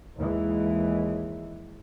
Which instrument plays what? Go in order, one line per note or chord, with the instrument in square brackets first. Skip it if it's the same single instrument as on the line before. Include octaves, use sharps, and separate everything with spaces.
[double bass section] D#2 E3 G#3